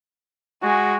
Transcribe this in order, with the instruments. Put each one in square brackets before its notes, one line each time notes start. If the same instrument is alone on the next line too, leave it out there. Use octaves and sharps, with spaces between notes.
[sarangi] G#3 [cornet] F#4